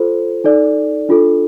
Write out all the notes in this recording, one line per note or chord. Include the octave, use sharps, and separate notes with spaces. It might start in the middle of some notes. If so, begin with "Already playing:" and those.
Already playing: F4 A4 C5
D#4 A4 D5
D4 F4 A4